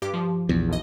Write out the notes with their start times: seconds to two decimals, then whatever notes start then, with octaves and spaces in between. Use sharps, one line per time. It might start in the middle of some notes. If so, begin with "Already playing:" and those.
0.02 G2 G4 D6
0.14 F3
0.49 A#1 E2
0.69 B1 D#5